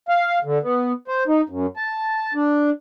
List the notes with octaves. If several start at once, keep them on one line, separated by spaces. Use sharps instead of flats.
F5
D3
B3
C5
D#4
F#2
A5
D4